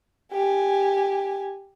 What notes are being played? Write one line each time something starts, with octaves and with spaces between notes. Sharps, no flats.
G4 G#5